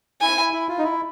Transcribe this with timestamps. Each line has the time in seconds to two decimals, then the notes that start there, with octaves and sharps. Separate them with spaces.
0.21 E4 G#5
0.38 E4
0.53 E4
0.69 F4
0.78 D#4
0.84 E4